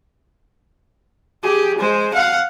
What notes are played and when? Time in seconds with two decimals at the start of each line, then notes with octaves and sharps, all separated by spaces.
1.43 G4 G#4
1.79 G#3 C5
2.14 F5 F#5